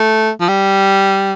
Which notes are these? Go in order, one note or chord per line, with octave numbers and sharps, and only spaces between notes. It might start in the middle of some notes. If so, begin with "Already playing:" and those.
Already playing: A3
F3
G3